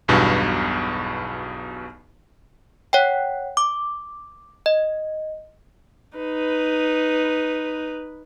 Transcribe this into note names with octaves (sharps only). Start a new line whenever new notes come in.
B1 E2 G2 B2
C#5 F#5 G5
D6
D#5
D#4 B4